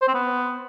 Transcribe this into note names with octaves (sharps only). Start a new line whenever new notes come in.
C5
C4
B3